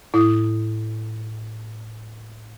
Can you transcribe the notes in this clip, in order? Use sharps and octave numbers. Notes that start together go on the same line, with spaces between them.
A2 E4 D#6